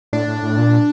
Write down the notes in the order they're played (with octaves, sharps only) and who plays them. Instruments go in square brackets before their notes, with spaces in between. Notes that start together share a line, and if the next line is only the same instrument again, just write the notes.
[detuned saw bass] A2 [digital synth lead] D4
[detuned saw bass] A2
A2
A#2